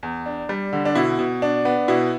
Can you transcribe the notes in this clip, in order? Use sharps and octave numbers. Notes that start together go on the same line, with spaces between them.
E2
D4
G3
D3
D4
B2 E4
B2
D4
B3
B2 E4